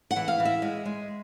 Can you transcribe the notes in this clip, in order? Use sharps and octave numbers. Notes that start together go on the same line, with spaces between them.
F#5
E3
F5
E3
E5
G#3
G#3